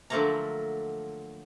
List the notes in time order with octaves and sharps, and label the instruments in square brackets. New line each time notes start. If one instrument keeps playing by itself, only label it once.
[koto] D3 F3 F#3 A3 A#3 A#5